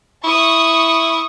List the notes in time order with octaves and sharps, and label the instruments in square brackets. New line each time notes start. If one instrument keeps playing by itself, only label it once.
[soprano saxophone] E4 [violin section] C#6 D#6